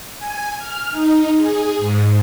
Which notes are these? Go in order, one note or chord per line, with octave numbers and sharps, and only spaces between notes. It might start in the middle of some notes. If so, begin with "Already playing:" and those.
G#5
F6
D#4
G#4
G#2